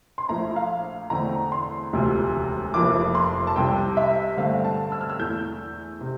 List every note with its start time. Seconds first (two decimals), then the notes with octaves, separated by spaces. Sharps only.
0.18 C6
0.29 A#1 A#2 A3 E4 A#5
0.56 F5
1.10 E2 D3 A3 C4 A#5
1.52 C6
1.93 E1 D2 C3 F3
2.74 F1 F2 E3 A#3 E4 D6
3.15 C6
3.47 A5
3.55 C2 C3 G3 G5
3.97 E5
4.37 G2 D3 A3 C4 F5
4.65 A5
4.92 E6
5.01 F6
5.10 E6
5.19 E2 E3 A3 G6
6.01 C3